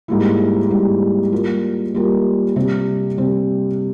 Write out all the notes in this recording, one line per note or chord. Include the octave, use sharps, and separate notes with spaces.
G#2 G3 A#3 E4
G#2 G3 A#3 E4
G3 A#3 F4 A#4
G3 A#3 F4 A#4
C3 G3 C4
C3 G3 C4